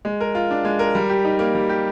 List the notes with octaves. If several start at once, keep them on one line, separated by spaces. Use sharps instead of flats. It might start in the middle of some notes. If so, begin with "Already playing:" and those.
G#3
A#4
F4
D4
G#3
A#4
G3
G4
D#4
A#3
G3
G4